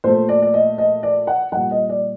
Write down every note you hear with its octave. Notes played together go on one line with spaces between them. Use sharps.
A#2 A3 C5
D5
D5
D#5
D#5
D5
F#5
A#2 G3 F#5
D#5
D5